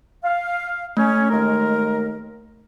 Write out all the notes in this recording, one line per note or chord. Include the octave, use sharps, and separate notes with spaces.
F5
A3 C#4
D#2 G#3 A#4